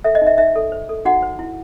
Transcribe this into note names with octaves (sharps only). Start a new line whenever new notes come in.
A4 E5
D#5
D#4
E5
D#4 E5
A4
C5
A4
D#4 F#4 F#5
C5
E4